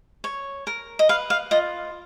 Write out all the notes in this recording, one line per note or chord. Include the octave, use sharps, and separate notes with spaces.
C#5
A#4
D#5
B4 F5
F5
F4 D#5